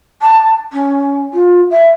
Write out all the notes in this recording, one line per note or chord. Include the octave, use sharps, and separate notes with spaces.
A5
C#4
F4
E5